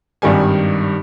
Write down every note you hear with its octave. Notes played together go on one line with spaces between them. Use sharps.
G#1 G2 D#3 G3 G#5